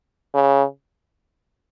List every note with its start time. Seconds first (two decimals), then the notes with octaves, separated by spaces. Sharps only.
0.34 C#3